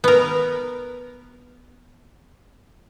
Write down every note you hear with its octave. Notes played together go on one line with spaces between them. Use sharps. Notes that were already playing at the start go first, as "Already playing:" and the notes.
B3 A#4